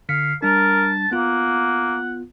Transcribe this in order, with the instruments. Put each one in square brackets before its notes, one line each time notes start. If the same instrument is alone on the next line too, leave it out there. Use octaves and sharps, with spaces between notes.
[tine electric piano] D3 B6 C#7 [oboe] F5
[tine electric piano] G3 D4 [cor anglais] A#4 [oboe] A5
[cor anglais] A#3 [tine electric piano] B3 F4 [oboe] F#5